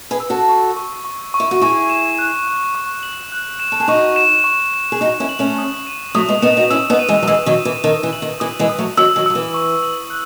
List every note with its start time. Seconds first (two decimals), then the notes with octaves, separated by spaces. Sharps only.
0.11 G#4 B4
0.20 E6
0.30 F#4 A4
0.49 C#6
0.77 C#6
1.05 C#6
1.34 C#6
1.40 E4
1.51 F#4
1.61 E4 G#4 C#6
1.90 E7
2.19 F#6
2.47 F#6
2.75 C#6
3.03 F#7
3.32 F#6
3.60 E7
3.72 A4
3.80 G#4
3.88 D#4 F#4 C#6
4.16 E7
4.44 C#6
4.74 E7
4.92 G#4
5.01 D#4 F#4 C#6
5.20 C#4 E4
5.29 F#7
5.39 A3 C#4
5.58 D#6
5.87 D#7
6.15 F#3 A3 D#6
6.28 G#3 B3
6.42 B3 D#4 E7
6.57 D#4 F#4
6.70 C#4 E4 E6
6.90 B3 D#4
6.99 D#7
7.08 E3 G#3
7.22 F#3
7.27 E3 G#3 E6
7.46 D#3 F#3
7.55 E6
7.65 E3
7.84 D#3 D#6
8.03 E3
8.13 F#7
8.22 D#3
8.40 E3 D#6
8.59 E3 G#3
8.70 D#6
8.78 F#3 A3
8.97 D#3 F#3 E6
9.16 D#3 F#3
9.26 F#3 E6
9.35 E3
9.54 C#6
9.83 F#7
10.10 F#6